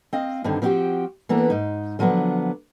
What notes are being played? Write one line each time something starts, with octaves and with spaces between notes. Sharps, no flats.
C4 D#5 F5
G2 D3 D#3 C4
F3 C4 D4 E4 F#4 G4
E3 A#3 B3 D4 A4
G#2 D#4
D3 F3 F#3 B3 D4